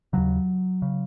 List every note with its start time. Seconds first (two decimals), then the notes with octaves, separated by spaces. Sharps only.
0.13 D#2 C#3 F#3
0.82 C#3